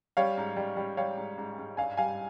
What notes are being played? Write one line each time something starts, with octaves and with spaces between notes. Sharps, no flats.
G3 C#5 F5
G#2
G3
G3
G3 C#5 F5
G#2
G#2
G#2
G2 F5 G#5
G3 F5 G#5